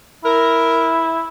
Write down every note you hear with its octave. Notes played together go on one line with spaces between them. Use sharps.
E4 A#4